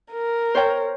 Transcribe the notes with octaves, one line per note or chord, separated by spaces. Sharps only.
A#4
C5 C#5 G5